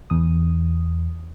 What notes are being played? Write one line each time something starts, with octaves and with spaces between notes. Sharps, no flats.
E2 D#6